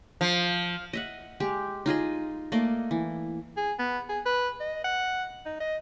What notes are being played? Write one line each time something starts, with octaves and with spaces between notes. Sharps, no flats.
F3
D#5 E5 F#5
G#3 G4
D#4 F4 G#4 D#5
A3 A#3 D5 D#5
E3
G#4
B3
G#4
B4
D#5
F#5
D#4
D#5